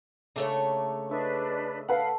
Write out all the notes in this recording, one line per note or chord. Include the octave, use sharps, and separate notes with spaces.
C#3 A3 A#3 D4 C#5 E5
D4 B4 D#5 E5 C#6
A4 B4 F5 F#5